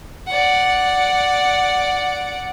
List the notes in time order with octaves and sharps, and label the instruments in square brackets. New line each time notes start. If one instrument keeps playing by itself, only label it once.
[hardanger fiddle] D5 F#5